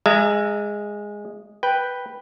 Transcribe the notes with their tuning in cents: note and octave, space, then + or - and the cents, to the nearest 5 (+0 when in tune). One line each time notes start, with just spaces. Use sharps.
G#3 -10 E5 +35 A#5 -40
B4 +0 G5 +0